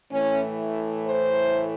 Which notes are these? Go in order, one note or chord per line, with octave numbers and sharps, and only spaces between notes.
A2 E3 A3 C#4
C5